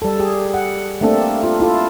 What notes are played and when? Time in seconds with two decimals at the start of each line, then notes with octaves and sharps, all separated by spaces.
0.02 G3 A4
0.19 G4 G#4
0.54 F#5
1.01 A3 A#3 C4 D4 A4
1.43 F4
1.60 E4 F4 A4